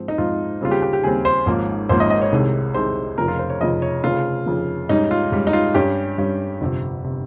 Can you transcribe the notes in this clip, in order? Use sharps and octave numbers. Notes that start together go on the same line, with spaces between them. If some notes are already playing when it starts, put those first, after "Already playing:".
Already playing: G#2 F3 C4
D#4
G#2 F3 C4 F4
D#2 C#3 G3 C4 F4
G4
G4
G4
D#2 C#3 G3 C4 G#4
C5
G#1 G#2 F3 A#3 C#4
G#1 G#2 F3 A#3 C#4 C5
D#5
D#5
C#5
C2 C3 D#3 G#3
C2 C3 D#3 G#3 C5
F1 F2 C#3 F3 A#4
F4
C5
C#5
F1 F2 C#3 F3 D#5
C#5
F1 F2 C#3 F3 F4
F1 F2 C#3 F3
G#2 G3 C#4 D#4
F4
G#2 G3 C#4
D#4
F4
G2 G3 C#4 G4
G2 G3 C#4
G1 F2 C3
C3